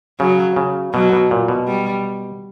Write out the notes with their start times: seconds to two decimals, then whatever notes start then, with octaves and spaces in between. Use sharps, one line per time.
0.20 C#3 F#3
0.56 C#3
0.93 B2 F#3
1.13 B2
1.31 A#2
1.48 B2
1.67 G3